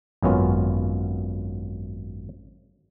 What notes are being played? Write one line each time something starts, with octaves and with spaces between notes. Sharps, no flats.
G#1 F#2 B3 C#4 F4